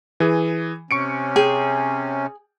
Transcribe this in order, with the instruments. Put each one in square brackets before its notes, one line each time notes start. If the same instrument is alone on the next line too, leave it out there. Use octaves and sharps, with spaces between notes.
[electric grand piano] E3 G#4
[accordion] C3 C#4 [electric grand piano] C#6 C#7 D7
[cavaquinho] G#4 [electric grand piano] G5